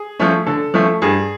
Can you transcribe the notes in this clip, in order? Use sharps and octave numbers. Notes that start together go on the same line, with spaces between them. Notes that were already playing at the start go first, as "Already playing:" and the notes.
Already playing: G#4
F3 A3 C#4
D3 A4
F3 A3 C#4
G2 G#4